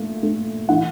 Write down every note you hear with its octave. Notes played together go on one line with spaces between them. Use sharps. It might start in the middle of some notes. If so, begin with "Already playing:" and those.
Already playing: A#2 A3
A3
E3 F#5